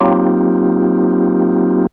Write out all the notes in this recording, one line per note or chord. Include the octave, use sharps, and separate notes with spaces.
F#3 A#3 C4 D#4 F4 G4